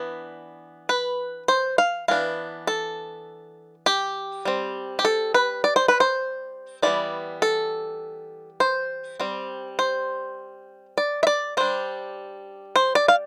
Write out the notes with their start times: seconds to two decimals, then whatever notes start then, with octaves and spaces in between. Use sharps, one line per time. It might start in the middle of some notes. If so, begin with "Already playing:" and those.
Already playing: E3 B3 D4
0.89 B4
1.48 C5
1.78 F5
2.08 E3 B3 D4 F5
2.67 A4
3.86 G4
4.45 G3 C4
4.99 G4
5.05 A4
5.34 B4
5.64 D5
5.76 C5
5.88 B4
6.00 C5
6.83 E3 G3 B3 D5
7.42 A4
8.60 C5
9.20 G3 C4
9.79 C5
10.98 D5
11.23 E5
11.27 D5
11.57 G3 D4 C5
12.76 C5
12.95 D5
13.08 F5